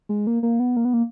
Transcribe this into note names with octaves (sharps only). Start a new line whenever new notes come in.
G#3
A#3
A#3
B3
A#3
B3
A#3